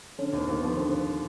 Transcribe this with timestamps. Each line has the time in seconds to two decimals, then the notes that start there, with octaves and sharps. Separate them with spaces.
0.19 D3 C#4
0.33 D#2 C4
0.48 D#2 A#3
0.58 B3
0.63 F3
0.77 D3 C4